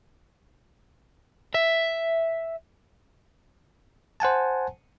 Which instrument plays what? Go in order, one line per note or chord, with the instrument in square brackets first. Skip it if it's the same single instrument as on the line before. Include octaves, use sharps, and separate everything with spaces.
[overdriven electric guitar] E5
[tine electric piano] C5 F#5 G#5 A5